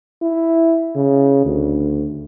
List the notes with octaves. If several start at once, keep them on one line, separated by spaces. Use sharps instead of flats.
E4
C#3
D2